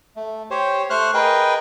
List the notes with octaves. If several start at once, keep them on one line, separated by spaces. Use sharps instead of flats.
A3
G4 C5 C#5
A3 C5 C#6 F6 F#6
G#4 A#4 B4 D#5 G5